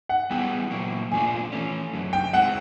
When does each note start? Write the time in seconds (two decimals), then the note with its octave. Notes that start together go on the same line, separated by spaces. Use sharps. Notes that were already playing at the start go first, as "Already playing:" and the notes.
0.09 F#5
0.30 G3 B3 E4 G#4 G5
0.71 A#2 F#3 A#3
1.12 A#2 F3 A3 D4 F4 G#5
1.52 E3 A3 C#4
1.93 F#2 D3 F#3
2.13 G5
2.33 G#3 C4 E4 F#5